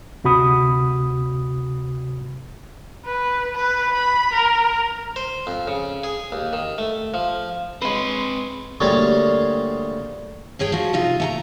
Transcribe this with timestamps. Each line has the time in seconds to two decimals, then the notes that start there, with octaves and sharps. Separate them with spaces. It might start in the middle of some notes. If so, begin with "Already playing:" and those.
0.24 D2 C3 F#4 B5 D#6
3.05 B4
3.55 B4
3.94 B5
4.33 A#4
5.16 C5
5.47 F2
5.68 C#3
6.04 G#4
6.32 D#2
6.53 D#3
6.78 A3
7.14 F3
7.82 G#3 C4 B4 C#5
8.80 D2 G3 A#3 F4 G#4 C#5
10.59 G2 G#4 C#5 G5
10.72 F3 F#4
10.93 C3 D#4 F4
11.20 A3 G5 A#5